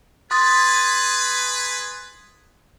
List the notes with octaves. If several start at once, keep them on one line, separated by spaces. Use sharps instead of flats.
G#4 B4 C6 D#6 A6